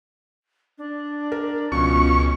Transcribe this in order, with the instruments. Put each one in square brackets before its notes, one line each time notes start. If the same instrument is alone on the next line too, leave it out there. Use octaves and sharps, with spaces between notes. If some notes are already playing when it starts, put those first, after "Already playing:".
[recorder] D4
[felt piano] A#4
[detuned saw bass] C#2 [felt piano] B2 F3 [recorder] C#4 [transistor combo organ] C#6